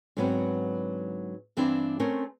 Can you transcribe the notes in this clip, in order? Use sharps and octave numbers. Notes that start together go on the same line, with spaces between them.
G#2 D3 F#3 B3 C4
G2 E3 C4 D4 E4 F5
A3 C4 C#4 A#4 C5